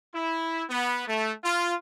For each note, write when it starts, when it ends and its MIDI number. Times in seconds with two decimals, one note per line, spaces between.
0.14 0.63 64
0.69 1.01 59
1.07 1.32 57
1.44 1.74 65